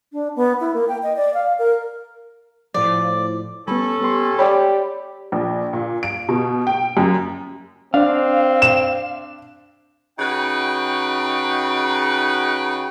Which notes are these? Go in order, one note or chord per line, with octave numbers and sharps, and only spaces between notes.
D4
B3
E4
A#3
G5
D#5
D5
F5
A#4
A2 F3 D5
G3 B3 C#4 A4 B5
B3 G4 C6
G4 C#5 D5 G5 B5
A#1
A#2
D7
B2
G5
F#2
C4 D4 F5
E7
C#3 D#4 F#4 B4 G5